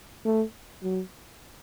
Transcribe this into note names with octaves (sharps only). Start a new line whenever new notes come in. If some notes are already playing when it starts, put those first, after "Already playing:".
A3
F#3